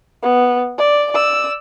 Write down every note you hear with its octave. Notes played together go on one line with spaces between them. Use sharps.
B3
D5
D5 E6